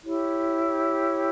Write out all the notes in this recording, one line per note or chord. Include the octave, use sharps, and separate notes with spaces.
E4 G4 C#5